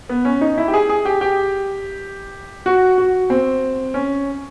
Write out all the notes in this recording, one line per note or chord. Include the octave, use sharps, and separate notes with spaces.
B3
C#4
D#4
E4
G4
G#4
G#4
G4
G4
F#4
F#4
C4
C#4